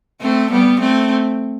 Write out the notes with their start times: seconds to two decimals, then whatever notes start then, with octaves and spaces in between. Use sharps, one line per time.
0.21 A3 C4
0.51 G3 B3
0.80 A3 C4